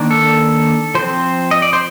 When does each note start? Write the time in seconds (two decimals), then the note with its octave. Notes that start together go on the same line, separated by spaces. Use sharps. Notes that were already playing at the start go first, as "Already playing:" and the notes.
Already playing: D#3 A#3 D4
0.11 A4
0.95 F3 C4 C5
1.51 D#5
1.62 D5
1.73 C5